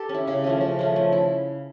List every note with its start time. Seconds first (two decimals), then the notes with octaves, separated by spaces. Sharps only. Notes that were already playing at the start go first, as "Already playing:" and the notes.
Already playing: G4 A4
0.09 C#4
0.14 E4
0.27 C#3
0.44 F3 A3 C#4
0.61 C#3
0.79 F3 A3 C#4
0.96 F3
1.13 E4